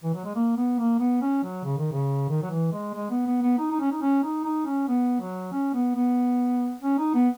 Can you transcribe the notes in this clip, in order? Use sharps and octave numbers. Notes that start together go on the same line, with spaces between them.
E3
F#3
G#3
A#3
B3
A#3
B3
C#4
F#3
C#3
D#3
C#3
D#3
F#3
E3
G#3
G#3
B3
B3
B3
D#4
D#4
C#4
D#4
C#4
D#4
D#4
C#4
B3
F#3
C#4
B3
B3
C#4
D#4
B3